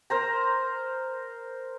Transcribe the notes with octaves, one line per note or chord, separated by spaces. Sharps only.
A#4 C5 A#5